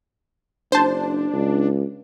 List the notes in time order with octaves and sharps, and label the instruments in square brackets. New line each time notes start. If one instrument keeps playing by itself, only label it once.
[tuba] F#1 [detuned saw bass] D4 [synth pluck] C5 A5
[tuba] C#2